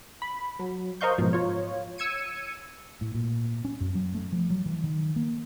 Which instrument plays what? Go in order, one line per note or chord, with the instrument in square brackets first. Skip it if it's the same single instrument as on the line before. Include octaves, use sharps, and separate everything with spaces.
[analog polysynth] B5
F#3
A#4 C5 D#5 F5 C#6 G6
G#2 B2 F3
F4 C#5
E6 G#6 C#7 D#7
[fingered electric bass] A2
A#2
C#4
F#2
F#3
A3
F3
F#3
E3
D#3
A#3